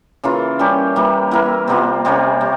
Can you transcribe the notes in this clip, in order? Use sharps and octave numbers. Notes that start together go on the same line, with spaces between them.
C#3 E3 A#3 F4
G3 C#4 G4 A#4
E3 G3 A#3
E3 A#3 E4 A#4
C3 G3 A#3 F4
C3 G3 A#3 C#4
C3